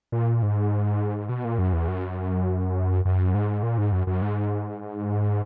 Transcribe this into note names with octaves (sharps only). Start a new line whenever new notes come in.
A#2
G#2
B2
A#2
F#2
E2
F#2
F#2
G#2
A#2
G#2
F#2
F#2
G#2